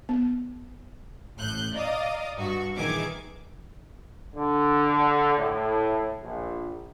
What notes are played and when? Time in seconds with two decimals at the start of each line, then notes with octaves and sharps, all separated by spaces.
0.09 B3
1.38 A1 A2 F#6 G6
1.73 D5 D#5 F5 A#5 D#6
2.37 G2 F#4 C#6
2.76 A#1 D#3 E3 G#4 D6 G#6
4.35 D3
5.37 A2
6.22 A#1